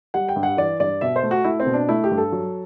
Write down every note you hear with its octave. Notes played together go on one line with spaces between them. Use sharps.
G3 F#5
G5
G2
F#5
E3 D5
G2 D5
B2 E5
C5
A3
F#4
A3 E4
C4
B2
D4
A3 E4
G4
G2
A4
F#3